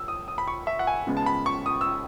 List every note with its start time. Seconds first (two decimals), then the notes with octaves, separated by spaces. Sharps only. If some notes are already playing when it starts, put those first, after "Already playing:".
Already playing: E6
0.08 D#6
0.28 D#6
0.38 B5
0.48 C#6
0.67 E5
0.79 F#5
0.87 G#5
1.07 C#3 G#3 B3
1.17 A5
1.26 B5
1.46 C#6
1.66 D#6
1.81 E6